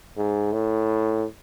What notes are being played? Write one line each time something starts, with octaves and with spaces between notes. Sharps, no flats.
G#2
A2